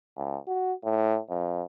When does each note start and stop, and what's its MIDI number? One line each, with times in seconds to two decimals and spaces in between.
0.17 0.38 37
0.47 0.73 66
0.84 1.19 45
1.30 1.62 41